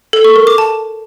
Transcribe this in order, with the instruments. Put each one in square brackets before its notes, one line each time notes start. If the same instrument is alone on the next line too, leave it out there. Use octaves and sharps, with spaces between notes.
[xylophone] A4
C#6
A#4
D6
A5